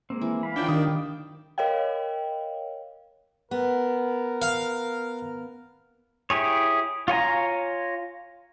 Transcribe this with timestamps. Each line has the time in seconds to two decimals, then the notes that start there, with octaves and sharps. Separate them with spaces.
0.10 G#3 A#3 C4
0.22 E3
0.43 F5 B5
0.56 D#3 F3 D4 C#5 G5
0.69 D#3 C4 G4 F5 D#6
1.58 A#4 C#5 D#5 F5 G5
3.51 B3 A#4
4.42 F5
6.30 E4 G4 G#4 C#5
7.08 F4 C#5 G#5 A#5